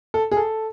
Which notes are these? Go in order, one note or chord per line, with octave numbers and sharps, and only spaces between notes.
A4
G#4
A4